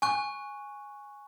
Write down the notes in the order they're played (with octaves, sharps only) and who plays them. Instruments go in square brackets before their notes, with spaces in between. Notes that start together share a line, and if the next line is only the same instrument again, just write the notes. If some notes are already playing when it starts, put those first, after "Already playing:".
[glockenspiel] G#5 C#6 F#6